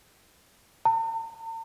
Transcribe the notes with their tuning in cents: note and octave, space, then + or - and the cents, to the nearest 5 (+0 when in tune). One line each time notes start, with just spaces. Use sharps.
A#5 -45